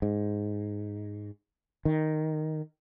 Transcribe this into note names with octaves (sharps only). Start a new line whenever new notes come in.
G#2
D#3